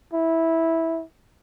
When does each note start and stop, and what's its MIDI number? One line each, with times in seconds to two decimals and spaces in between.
0.13 1.03 64